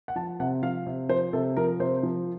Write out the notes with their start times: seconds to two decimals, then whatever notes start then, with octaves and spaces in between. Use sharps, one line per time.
0.08 F#5
0.16 F3 A5
0.40 C3 F#5
0.62 F3 F5
0.86 C3
1.09 F3 C5
1.33 C3 A4
1.57 F3 A#4
1.79 C3 C5
2.03 F3